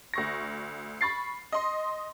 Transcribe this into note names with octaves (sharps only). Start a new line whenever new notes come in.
D2 C#6 A#6
B5 C#6 A6 C7
D#5 C6